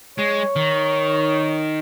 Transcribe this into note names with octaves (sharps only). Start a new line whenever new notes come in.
G#3 C#5
D#3